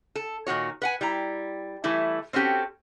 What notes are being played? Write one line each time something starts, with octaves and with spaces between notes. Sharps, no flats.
A4
A#2 D#3 F#4 C#5
B4 F#5 G#5
G3 E4 A#5
E3 G3 A3 E4
C4 C#4 F#4 G4 A4